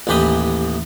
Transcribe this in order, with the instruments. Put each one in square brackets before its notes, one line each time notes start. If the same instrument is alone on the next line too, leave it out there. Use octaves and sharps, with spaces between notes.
[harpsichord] A1 D#2 E3 G4 B5 D#6